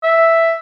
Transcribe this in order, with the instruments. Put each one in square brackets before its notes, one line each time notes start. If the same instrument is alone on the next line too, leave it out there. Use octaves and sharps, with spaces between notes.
[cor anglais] E5